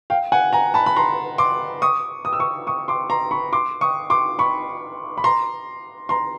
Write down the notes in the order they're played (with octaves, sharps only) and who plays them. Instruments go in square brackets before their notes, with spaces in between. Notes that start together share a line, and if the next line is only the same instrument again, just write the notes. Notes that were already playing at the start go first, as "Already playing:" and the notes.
[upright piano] F5 G5
F#5 G#5
G#5 A#5
A5 B5
B5
A#5 C6
C6 D6
C#6 D#6
D#6
E6
C#6 D#6
C#6 D#6
C6 D6
A#5 C6
B5 C#6
C6 D6
C#6 D#6
C6 D6
B5 C#6
B5
A#5 C6
A#5 C6